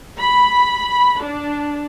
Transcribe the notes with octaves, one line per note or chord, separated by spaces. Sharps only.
B5
D4